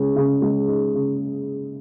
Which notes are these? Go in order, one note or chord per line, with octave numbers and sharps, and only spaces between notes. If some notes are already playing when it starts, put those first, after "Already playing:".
Already playing: C#3 G#3
C#3
G#3
D#4
C#3